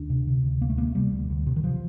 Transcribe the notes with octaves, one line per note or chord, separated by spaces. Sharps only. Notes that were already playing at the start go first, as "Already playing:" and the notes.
Already playing: D2 D4
C3
C3
D2
D2 A#3
A3
C3 A#3
C3 G3
D2
D2
C3
D#3
C3 F3